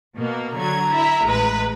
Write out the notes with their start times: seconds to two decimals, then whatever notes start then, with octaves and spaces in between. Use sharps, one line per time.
0.15 B2 A#3
0.57 D3 F#3 A#5 G#6
0.93 E4 E5
1.25 A1 G#3 B4